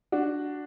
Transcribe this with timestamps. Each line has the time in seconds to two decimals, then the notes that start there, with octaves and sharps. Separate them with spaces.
0.12 D4 F#4